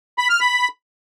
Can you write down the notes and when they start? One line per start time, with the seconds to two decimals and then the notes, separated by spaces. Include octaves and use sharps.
0.18 B5
0.29 F6
0.41 B5